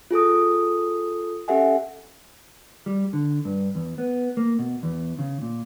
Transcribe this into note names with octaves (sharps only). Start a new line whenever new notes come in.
F4 G#4 A4 D#6
C#4 G4 A4 E5 F#5 G#5
G3
D3
G2
E2
B3
A#3
B2
E2
C#3
A#2